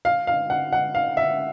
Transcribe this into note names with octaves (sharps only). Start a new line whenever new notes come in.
F5
F5
F#5
F#5
F5
E5